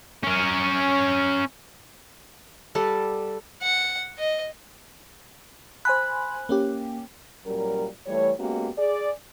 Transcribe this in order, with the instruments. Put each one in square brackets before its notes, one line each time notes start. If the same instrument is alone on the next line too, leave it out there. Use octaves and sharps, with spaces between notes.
[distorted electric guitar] C#4 A#4
[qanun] G3 A4 F#5
[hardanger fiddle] F#5
D#5
[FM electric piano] C5 G#5 B5 [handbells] F#6
[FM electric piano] A#3 C#4 G4
[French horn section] A#2 F#3 G3 C#4 A#4
E3 G3 A3 C#5
G#3 A#3 B3 C#4 F#4 G4
G#4 D5